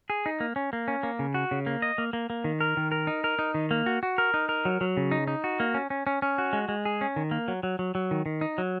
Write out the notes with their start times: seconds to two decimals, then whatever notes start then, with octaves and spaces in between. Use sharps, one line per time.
0.10 G#4
0.26 D#4
0.40 A#3
0.56 C#4
0.73 A#3
0.88 C#4
1.03 A#3
1.19 C#3
1.34 F#4
1.51 C#3
1.66 A#3
1.82 D#5
1.98 A#3
2.13 A#3
2.30 A#3
2.44 D#3
2.61 A#4
2.77 D#3
2.92 A#4
3.07 D#4
3.24 A#4
3.39 D#4
3.54 D#3
3.71 A#3
3.86 F#4
4.03 F#4
4.18 A#4
4.34 D#4
4.49 A#4
4.65 F#3
4.81 F#3
4.97 C#3
5.11 D#4
5.28 D#4
5.44 F#4
5.60 A#3
5.74 C#4
5.90 C#4
6.07 C#4
6.22 C#4
6.38 F#4
6.53 G#3
6.69 G#3
6.85 G#4
7.01 C#4
7.16 D#3
7.31 A#3
7.48 F#3
7.63 F#3
7.79 F#3
7.95 F#3
8.11 D#3
8.26 D#3
8.41 D#4
8.58 F#3